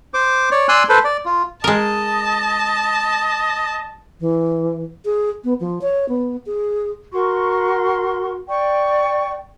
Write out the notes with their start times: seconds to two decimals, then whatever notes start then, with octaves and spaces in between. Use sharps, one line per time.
0.14 C5 D6
0.51 C#5 D5
0.69 D5 G#5 C6 E6 F#6
0.89 A4 B4 C5
1.04 D5
1.25 F4
1.64 G#3 A#4 D#5 A5
4.20 E3
5.05 G#4
5.44 B3
5.60 F3
5.82 C#5
6.09 B3
6.46 G#4
7.13 F#4 A#4 C6 C#6
8.48 D5 G5 C#6